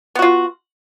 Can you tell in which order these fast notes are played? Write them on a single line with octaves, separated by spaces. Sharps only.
B3 F#4 F4